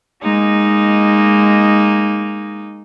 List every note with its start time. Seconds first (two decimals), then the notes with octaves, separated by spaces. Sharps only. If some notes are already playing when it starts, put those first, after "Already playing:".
0.22 G#3 A#3 D#4